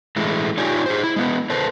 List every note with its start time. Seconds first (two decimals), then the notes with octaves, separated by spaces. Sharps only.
0.16 A2 E3 G#3 A3
0.58 D#4 F4 G4 C#5 D5 G#5
0.86 G#4 C5
1.03 E4
1.16 G#3 B3
1.50 A4 B4 C5 A5